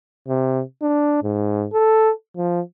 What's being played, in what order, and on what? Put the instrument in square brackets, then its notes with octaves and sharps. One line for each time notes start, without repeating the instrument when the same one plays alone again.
[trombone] C3
D4
G#2
A4
F3